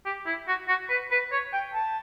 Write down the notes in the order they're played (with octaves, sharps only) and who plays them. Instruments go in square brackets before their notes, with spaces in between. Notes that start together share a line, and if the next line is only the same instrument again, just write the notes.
[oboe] G4
E4
F#4
F#4
B4
B4
C#5
G5
A5